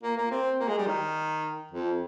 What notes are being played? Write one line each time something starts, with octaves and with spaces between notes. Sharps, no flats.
A#3
A#3
C4
A#3
G#3
G3
D#3
F2